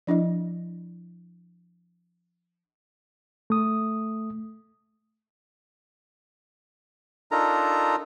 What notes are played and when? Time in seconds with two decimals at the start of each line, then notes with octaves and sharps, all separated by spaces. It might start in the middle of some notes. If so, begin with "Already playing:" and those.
0.07 F3 D4 E4 D#5
3.50 A3 D#6
7.32 D4 D#4 F4 A4 A#4 A#5